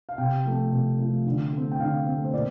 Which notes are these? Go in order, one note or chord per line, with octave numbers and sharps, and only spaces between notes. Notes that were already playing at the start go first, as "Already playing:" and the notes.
F5
C3 G5
F3 A3
C3
F3 A3
D3
A3 C4
G5
D3 F5
A3 C4
C5
A#2 D5